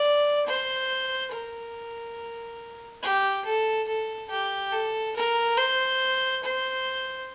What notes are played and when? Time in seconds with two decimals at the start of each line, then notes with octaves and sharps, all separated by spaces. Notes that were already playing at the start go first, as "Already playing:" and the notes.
Already playing: D5
0.47 C5
1.32 A#4
3.03 G4
3.45 A4
3.88 A4
4.30 G4
4.72 A4
5.16 A#4
5.58 C5
6.44 C5